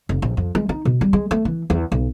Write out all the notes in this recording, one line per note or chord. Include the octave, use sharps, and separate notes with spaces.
F1
A#1
F2
G#3
D#4
B2
G3
G#3
A3
E3
E2
B1